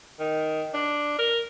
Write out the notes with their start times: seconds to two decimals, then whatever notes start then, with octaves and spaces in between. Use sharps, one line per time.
0.20 D#3
0.74 D4
1.19 A#4